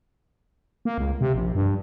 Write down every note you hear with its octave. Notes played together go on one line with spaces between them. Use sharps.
A#3
C#2
C3
A#1
G2